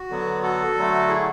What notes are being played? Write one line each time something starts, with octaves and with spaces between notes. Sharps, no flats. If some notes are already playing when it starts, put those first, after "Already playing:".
Already playing: F#4
D3 F#3 B3
F#4 A4
D3 F#3 A3
E4 G#4